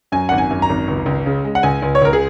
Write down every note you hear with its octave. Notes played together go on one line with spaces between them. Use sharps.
F#2 G#5
G#1 F#5
G#5
F#2
A#5
G#1
C#2
C#2
C#3
G#3
F#5
C#2 G#5
C#2
C#5
C#2 A#4
G#4